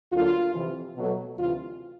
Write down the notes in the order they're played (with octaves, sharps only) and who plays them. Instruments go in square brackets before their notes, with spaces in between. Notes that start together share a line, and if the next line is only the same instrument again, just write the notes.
[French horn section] D2 D3 F#3 A#3 F4
F2 C3 E3
B2 F#3 A3
D2 C3 E3 F4